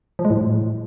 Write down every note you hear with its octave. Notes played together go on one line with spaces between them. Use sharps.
F3
G#3
A2